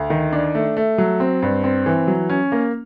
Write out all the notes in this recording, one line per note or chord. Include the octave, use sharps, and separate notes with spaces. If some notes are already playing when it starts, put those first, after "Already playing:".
Already playing: D2
D#3
D4
A3
A3
F#3
C4
G2
C4
E3
F#3
C#4
A#3